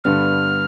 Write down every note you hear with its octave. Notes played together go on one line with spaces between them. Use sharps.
G2 D3 G3 B3 F6